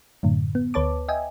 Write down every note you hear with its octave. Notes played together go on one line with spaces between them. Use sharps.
F#2 A2 D3
B3
D2 B4 C#5 A5 D6
D#5 E5 G5 G#5